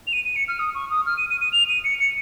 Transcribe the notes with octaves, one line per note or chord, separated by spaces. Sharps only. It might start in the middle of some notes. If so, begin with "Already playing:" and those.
F7
D#7
D#7
C#7
F6
D#6
C#6
D#6
F6
D#7
D#7
D#7
F7
D#7
C#7
C#7